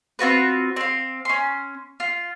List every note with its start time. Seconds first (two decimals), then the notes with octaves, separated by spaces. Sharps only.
0.19 C4 F4 F#4 B4
0.76 C4 F5
1.25 C#4 C6
2.00 F4